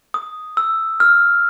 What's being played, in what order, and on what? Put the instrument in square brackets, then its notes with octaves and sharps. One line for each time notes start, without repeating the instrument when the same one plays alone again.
[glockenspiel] D#6
E6
F6